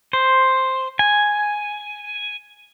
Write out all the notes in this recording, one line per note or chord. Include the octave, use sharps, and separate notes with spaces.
C5
G#5